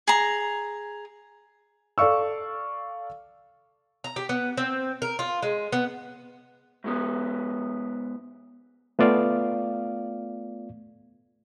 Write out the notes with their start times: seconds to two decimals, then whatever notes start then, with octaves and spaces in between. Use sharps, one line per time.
0.07 G#4 A#5
1.98 A4 D5 F5 C#6 E6
4.04 A#5
4.16 G4
4.29 B3
4.57 C4
5.02 A#4
5.19 F4
5.43 G#3
5.72 B3
6.84 G#2 G#3 B3
8.99 A3 B3 F4 D5 F5